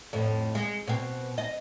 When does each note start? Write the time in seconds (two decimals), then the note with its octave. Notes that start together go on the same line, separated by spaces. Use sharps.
0.13 F2 A2
0.55 G#3
0.88 B2 C4
1.38 D#5